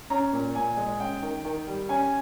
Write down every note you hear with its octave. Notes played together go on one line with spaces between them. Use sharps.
C#4 A#5
A#2
A#2 G#5
G#3
C#4 G5
D#3
D#3
G3
C#4 G#5